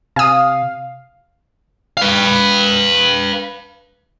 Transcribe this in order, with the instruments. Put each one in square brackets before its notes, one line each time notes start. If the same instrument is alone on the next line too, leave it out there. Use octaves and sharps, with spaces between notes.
[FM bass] C3 [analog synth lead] F5 [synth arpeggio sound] G#5 D#6
[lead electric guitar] B4 F5